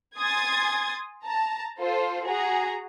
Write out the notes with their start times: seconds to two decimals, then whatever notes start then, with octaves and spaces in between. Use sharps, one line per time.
0.18 G#5 C6 D#6 G#6 A6
1.25 A5 A#5
1.79 F4 A4 C5
2.27 F#4 G#4 A#5